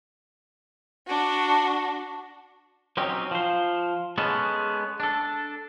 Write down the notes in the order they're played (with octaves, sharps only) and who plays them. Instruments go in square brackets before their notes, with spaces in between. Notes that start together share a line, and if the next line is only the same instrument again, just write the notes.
[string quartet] D4 F#4
[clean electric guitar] F#3 C4 C#4 D#4 G4
F3 C5
G#3 B3 C#4 A4
D4 A4